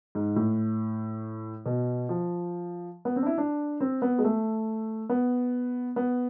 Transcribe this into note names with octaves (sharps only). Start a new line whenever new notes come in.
G#2
A2
B2
F3
B3
C4
D4
E4
D4
C4
B3
G#3
A3
B3
B3